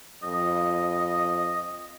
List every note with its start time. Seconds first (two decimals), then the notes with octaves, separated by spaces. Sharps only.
0.23 F2 D#5